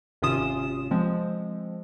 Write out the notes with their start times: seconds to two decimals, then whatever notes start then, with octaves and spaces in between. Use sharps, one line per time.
0.22 G#1 C3 C#4 F4 D#6 E7
0.91 F3 G#3 C4